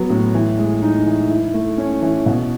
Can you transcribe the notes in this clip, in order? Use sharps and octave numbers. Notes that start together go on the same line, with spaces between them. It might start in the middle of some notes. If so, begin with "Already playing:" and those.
Already playing: F#3 B3 F#4
A2
E3
G#3
D#4
E3
E4
A3
C#4
E3
B2